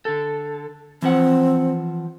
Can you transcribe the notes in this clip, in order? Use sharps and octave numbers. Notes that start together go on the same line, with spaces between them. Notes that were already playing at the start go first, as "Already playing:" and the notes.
D3 A4
E3 F3 C4 F#5